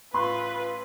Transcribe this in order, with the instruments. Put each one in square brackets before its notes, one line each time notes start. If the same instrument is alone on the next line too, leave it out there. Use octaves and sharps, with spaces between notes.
[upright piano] A1 C6 F#6 [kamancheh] F4 B4